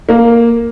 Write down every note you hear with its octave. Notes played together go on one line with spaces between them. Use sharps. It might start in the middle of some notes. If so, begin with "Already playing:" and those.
A#3